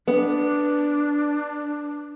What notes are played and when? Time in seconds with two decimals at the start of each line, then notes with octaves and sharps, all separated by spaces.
0.08 B3 D4